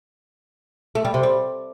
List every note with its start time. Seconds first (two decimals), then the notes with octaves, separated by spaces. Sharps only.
0.95 A3
1.05 G3
1.14 C3
1.23 G3